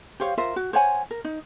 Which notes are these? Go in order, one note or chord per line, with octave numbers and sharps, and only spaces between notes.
G4 C5 C#5 F5
F4 A#4 C5 E5
F#4
C5 C#5 F#5 G#5
A#4
D#4